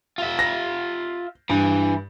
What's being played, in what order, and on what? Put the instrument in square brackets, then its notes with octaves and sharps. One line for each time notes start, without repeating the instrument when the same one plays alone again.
[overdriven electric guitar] F4 E5
[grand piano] A#6
[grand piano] G2 [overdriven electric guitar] E3